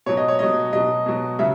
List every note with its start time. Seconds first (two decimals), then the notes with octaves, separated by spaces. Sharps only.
0.06 B2 C#5
0.09 F#3
0.17 D#5
0.28 C#5
0.39 B2 F#3 D#5
0.73 B2 F#3 D#5
1.06 B2 F#3
1.39 C#3 F#3 E5